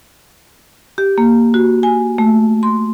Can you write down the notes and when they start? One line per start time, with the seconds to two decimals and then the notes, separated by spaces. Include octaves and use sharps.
0.98 G4
1.18 A#3
1.54 F#4
1.83 G#5
2.18 A3
2.63 C6